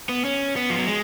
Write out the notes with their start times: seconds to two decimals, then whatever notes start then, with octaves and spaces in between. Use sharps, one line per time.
0.09 B3
0.25 C#4
0.56 B3
0.70 F3
0.78 F#3
0.87 G#3